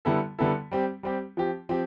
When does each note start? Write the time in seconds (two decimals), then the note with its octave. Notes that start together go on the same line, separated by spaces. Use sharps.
0.05 D3 G3 B3 E4 A4
0.39 D3 G3 B3 E4 A4
0.71 G3 C4 G4
1.03 G3 C4 G4
1.37 F3 C4 G4
1.69 F3 C4 G4